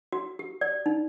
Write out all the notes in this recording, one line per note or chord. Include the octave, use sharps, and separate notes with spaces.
F#4
G4
D5
D#4